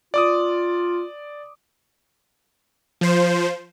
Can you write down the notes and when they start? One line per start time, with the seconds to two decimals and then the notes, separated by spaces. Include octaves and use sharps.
0.14 F4 D5 D6 D#6
3.01 F3 C5